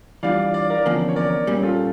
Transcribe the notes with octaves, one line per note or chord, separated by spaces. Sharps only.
E3 G3 D4 F4 D5 F5
D5 F5
A#4 D5
E2 D3 F3 A#3 C#4
C#5
A#4 D5
A#2 G3 C#4
F4 A4